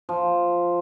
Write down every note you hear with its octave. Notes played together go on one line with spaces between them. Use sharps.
F3